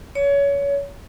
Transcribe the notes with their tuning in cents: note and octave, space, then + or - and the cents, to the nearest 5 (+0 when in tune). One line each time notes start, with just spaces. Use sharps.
C#5 +25